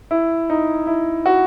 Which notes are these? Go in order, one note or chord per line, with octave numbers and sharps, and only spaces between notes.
E4
D#4
E4
F#4